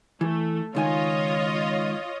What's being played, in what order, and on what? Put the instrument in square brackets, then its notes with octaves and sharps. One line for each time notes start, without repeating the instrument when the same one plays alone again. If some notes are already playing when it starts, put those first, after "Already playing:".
[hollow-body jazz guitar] E3 [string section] A3
[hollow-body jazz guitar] C#2 D#3 G#5 [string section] F4 C#5 D#5